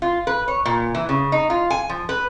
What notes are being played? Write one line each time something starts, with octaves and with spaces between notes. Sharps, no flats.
F4
B4
C#5
A#2
E3
C#3
D#4
F4
G#5
F3
B4